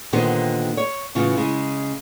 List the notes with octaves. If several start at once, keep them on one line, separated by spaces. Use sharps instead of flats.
A#2 D3 D#3 B3 G4 C5
C#5
A2 C#3 E3 B3 F4
C#3 G#3